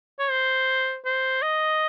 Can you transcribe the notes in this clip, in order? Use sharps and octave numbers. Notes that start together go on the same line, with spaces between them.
C#5
C5
C5
D#5